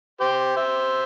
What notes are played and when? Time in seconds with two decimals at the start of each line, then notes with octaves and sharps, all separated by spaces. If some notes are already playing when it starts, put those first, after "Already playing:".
0.21 G4 C5
0.56 C5 E5